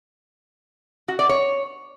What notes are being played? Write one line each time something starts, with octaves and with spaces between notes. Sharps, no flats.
F#4
D5
C#5